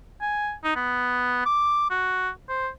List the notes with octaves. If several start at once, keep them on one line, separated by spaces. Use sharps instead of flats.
G#5
D#4
B3
D6
F#4
C5